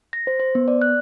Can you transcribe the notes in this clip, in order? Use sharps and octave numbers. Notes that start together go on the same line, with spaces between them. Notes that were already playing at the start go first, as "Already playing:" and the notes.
A#6
C5
C5
B3
D5
F#6